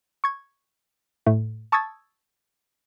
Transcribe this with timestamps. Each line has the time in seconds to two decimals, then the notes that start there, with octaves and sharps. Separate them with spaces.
0.24 C#6 G#6
1.27 A2 A3
1.72 A5 C#6 D#6 E6 G#6 A6